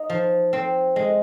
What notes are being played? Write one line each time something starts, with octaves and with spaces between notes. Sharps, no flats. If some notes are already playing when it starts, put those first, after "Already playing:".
Already playing: D#4
F3
C4
G#3